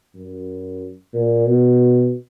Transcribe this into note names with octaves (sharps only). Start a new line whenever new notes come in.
F#2
A#2
B2